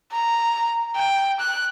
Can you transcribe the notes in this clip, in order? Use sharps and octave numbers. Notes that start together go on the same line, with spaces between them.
A#5
G5
F#6